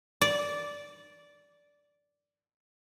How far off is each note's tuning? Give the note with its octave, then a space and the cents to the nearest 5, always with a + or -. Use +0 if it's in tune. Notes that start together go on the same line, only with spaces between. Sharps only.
D5 -10